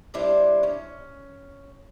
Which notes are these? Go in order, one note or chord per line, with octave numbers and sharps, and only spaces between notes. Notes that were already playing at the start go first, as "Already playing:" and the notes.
G3 D4 E4 C5
C#4